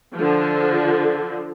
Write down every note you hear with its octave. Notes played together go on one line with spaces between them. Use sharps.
D3 F3